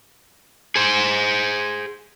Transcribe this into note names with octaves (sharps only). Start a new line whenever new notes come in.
G#4 C5